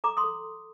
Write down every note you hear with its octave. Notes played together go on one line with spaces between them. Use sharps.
A4 A#5 D6
C6 D#6
A4